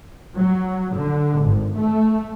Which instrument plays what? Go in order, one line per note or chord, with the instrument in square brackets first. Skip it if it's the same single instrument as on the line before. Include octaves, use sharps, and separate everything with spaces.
[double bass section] F#3
D3
G#1
A3